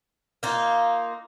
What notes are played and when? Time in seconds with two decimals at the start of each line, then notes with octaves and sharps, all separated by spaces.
0.43 A#3 D#4 F4